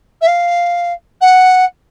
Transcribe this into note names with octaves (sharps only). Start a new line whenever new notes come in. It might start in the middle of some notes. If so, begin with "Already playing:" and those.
E5
F5
F#5